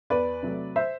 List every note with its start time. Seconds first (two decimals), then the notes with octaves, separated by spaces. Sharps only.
0.10 E2 B4 D5
0.43 C3 F#3 A3
0.76 C5 E5